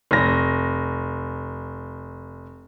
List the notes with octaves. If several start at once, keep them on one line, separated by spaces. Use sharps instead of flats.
F1 A#6